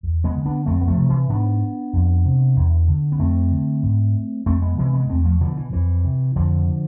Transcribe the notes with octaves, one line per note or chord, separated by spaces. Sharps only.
E2
G#3 B3
D3
B3 D4
F2 A3 C4
B3
F3 A3
C3
E3
G#2 B3 D4
F2
C3
E2
D3
B3
F2 A3 C4
D3
G#2
F2 A3 C4
G#3 B3
C3 E3 G#3
G#3 B3
E2 A3 C4
F3 A3
B2 D3 F3
E3
F2 E3
C3
F2 D3 F3
D3